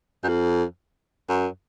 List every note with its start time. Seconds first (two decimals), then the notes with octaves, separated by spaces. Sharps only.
0.23 F#2
0.29 F2
1.29 F#2